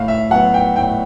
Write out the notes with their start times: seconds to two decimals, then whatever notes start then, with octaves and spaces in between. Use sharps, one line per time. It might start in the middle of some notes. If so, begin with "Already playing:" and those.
Already playing: A2 F5
0.08 E5
0.30 F#3 B3 F#5
0.54 G5
0.76 A2 G5